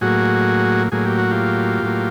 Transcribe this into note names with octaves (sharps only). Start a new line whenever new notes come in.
A2 F#3 A#3 F#4 G#4
A2 F#3 A#3 G#4
G4
F#4
F4 G4
A2 F#3 A#3